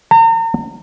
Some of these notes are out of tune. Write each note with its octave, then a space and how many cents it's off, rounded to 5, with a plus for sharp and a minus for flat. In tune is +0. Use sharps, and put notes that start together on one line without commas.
A#5 -40